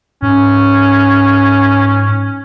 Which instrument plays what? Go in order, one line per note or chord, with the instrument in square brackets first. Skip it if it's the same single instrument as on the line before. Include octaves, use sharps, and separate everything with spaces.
[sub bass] G#2 [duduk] C#4